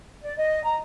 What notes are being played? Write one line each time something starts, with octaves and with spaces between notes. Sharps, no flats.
D5
D#5
A#5